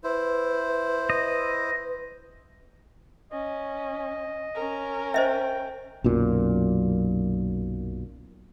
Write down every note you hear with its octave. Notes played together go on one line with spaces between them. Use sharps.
E4 B4 C5
D#5
C#4 D#5
C#4 A#4
C5 D#5 E5 G5
B1 F#2 A#2